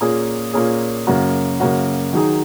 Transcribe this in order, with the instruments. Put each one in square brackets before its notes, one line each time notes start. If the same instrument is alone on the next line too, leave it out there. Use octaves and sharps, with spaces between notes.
[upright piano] A#2 A#3 C#4 G#4
A#2 A#3 C#4 G#4
F#2 C#3 A#3 C#4 F#4
F#2 C#3 A#3 C#4 F#4
D#3 F#3 D#4 G#4